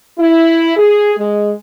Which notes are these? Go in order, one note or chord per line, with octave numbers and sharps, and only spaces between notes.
E4
G#4
G#3